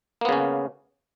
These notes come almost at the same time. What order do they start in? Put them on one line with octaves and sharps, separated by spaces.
A#3 B3 C#3 C#4